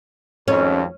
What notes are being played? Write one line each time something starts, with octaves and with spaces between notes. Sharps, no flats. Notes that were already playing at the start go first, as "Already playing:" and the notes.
G#1 F2 C#4